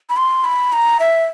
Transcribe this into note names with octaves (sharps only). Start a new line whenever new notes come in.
B5
C6
B5
A#5
E5